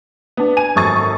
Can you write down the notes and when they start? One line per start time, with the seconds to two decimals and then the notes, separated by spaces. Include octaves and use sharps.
0.37 B3 D4
0.57 G#5 D#7
0.76 G#1 F#2 A4 C#6 D#6 A6